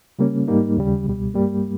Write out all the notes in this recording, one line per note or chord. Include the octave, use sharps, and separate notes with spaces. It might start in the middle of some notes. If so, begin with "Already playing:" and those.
C#3 G3 A#3 C#4
G#2 G3 A#3 D#4
D#2 C#3 G3
C#2 B2 G3
G2 G3 A#3